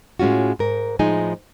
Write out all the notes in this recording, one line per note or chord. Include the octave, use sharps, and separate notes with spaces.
A2 G#3 C#4 F4 F#4
G#2 A#4
A2 F3 G#3 D#4 G#5